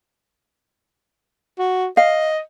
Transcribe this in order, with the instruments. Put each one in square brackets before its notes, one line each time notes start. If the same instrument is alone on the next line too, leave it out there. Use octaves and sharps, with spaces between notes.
[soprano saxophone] F#4
[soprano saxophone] D#5 [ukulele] F5